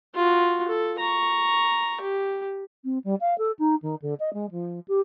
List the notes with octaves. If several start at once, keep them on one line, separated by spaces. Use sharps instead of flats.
F4 F#4
A4
A#5 C#6
G4
C4
G3
F5
A4
D#4
D#3
D3
D#5
G#3
F3
G4